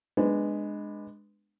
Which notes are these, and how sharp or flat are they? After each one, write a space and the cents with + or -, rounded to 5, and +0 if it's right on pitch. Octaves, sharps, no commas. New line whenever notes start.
G#3 +0 B3 +0 D4 +20